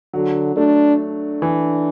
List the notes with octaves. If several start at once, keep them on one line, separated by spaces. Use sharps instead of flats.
D3 F#3
A3 D4
D4
E3